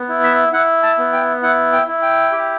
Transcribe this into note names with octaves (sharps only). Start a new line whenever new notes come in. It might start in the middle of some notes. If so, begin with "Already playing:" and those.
Already playing: B3
E4
E5
E4 F#5
A5
B3
G5
E4 F#5
G5
E4
G5
G4